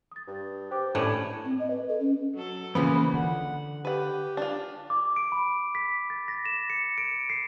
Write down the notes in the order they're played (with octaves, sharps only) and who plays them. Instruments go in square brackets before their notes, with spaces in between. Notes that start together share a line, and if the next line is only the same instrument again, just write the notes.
[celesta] D#6 A6
[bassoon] G2
[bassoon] G4 [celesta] C5 D6
[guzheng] A2 [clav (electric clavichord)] A3 C#4 D4 [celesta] B4 G#6
[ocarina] C4
D#5
B4
A4
C#4
[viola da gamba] F#3 A4
[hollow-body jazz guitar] C#3 F3 B3 [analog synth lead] E3 [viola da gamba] A#3 [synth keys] B5
[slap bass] D3 [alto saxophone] F#5
[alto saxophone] G4 [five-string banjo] B4 F#5
[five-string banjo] D4 F4
[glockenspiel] D6
D7
B5
B6
A6
A#6
E7
C#7
D7
C7